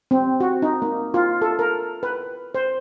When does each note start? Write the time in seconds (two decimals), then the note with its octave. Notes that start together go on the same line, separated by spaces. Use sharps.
0.11 C4
0.40 F#4
0.62 D#4
0.82 A#3
1.14 F4
1.42 A4
1.59 A#4
2.03 B4
2.55 C5